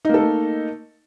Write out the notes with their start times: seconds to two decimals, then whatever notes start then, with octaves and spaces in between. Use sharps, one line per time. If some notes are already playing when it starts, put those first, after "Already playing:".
0.05 D#4
0.09 A#3
0.14 A4
0.19 A3